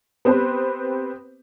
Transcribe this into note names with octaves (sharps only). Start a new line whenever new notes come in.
B3 C4 G4 B4 C5